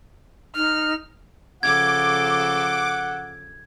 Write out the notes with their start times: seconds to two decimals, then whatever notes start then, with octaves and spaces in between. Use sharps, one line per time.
0.56 D#4 F6
1.63 C#3 F3 A4 F#5 D6 G#6